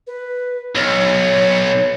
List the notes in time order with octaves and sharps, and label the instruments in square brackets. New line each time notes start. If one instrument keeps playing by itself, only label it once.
[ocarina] B4
[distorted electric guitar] B1 [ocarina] C#5